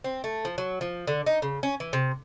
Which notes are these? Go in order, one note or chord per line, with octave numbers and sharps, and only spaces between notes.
C4
A3
F3
F#3
F3
D3
D#4
C#3
C#4
E3
C3